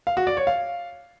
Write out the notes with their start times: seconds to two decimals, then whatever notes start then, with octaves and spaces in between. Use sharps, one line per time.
0.07 F5
0.17 F#4
0.27 D5
0.37 C#5
0.47 F5